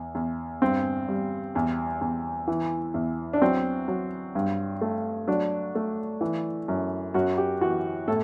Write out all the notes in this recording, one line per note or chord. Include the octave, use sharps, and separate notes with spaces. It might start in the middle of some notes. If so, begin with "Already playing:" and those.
Already playing: E2
E2
G2 C4
G3
E2
E2
E3
E2
D4
F#3 C4
F#3
G2
A3
F#3 D4
A3
E3
F#2
F#2 F#4
G4
E3 F#4
A2 A4